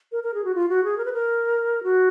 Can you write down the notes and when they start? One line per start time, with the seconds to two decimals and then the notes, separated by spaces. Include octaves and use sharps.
0.12 A#4
0.24 A#4
0.34 G#4
0.45 F#4
0.55 F4
0.69 F#4
0.84 G#4
0.98 A#4
1.05 B4
1.13 A#4
1.84 F#4